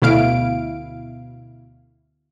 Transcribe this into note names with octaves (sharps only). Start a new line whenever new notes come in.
D2 B2 E4 F5 D7